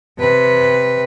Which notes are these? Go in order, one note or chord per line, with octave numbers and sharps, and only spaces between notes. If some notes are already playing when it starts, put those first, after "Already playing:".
C3 B4